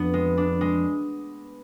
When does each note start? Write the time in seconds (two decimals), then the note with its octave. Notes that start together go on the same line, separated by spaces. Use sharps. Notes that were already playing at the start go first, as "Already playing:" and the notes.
Already playing: F2 B3 D4
0.14 G#3
0.37 D4
0.61 G#3